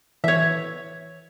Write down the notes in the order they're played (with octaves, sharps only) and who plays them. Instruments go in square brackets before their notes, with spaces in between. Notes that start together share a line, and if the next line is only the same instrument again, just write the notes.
[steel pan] E3 [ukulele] C#5 E5